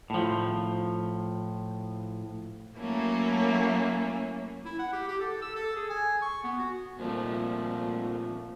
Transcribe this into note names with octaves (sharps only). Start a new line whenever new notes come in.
A2 F3
F#3 A3 A#3 C#4 E4
E4
F#5
G4
G4
A4
E6
A4
G#4
G#5
C#6
B3
F#4
F2 A#2 F3 G3 A3